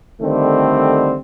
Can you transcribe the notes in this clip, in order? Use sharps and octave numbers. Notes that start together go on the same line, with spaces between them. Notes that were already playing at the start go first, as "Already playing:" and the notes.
D3 D#3 G3 A3 C4